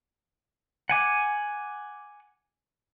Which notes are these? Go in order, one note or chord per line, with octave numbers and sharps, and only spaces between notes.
F#5 G#5 D6